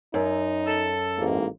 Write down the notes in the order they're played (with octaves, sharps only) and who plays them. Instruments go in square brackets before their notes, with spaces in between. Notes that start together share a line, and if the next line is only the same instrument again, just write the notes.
[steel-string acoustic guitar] F#2 [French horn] D#4
[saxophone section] A4
[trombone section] A1 G#2 [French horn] A#3